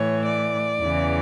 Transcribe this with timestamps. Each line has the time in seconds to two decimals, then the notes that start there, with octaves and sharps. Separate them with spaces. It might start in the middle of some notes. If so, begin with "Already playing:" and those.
Already playing: A2 E3 C#5
0.25 D5
0.80 E2 C#3 E3